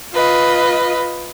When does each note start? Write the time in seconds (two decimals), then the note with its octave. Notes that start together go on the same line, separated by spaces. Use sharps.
0.13 F4 B4 D#5